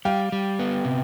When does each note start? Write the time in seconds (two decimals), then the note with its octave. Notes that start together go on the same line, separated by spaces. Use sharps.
0.05 G3 F5 G5
0.32 G3
0.59 B3
0.85 C3